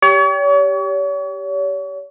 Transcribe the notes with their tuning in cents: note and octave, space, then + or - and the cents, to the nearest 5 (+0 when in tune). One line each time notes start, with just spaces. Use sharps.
G4 +0 C#5 +40